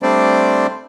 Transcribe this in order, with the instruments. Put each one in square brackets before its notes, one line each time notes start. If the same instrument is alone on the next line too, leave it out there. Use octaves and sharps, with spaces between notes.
[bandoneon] G3 A3 C4 D4 C5 D5